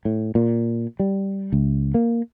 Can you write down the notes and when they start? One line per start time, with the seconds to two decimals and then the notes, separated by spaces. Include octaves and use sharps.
0.05 A2
0.35 A#2
1.00 G3
1.52 C#2
1.94 A#3